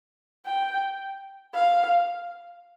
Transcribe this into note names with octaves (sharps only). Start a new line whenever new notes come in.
G5
F5